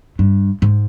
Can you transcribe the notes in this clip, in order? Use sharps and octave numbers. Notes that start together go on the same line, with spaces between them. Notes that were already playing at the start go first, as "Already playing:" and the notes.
G2
G#2